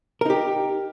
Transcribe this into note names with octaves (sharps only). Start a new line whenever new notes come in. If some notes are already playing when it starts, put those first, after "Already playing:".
D#4 G4 A#4